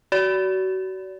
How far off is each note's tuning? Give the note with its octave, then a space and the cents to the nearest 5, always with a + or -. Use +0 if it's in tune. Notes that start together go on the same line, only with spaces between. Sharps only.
F#4 +30 D5 -35